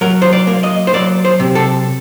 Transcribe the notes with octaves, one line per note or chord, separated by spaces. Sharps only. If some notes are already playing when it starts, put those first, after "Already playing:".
F#3 A#4
C5
D5
A#3
D#5
C5
F#3 D5
C5
C3
A4